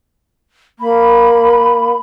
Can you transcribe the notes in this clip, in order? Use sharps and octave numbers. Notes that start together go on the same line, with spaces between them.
A#3 B5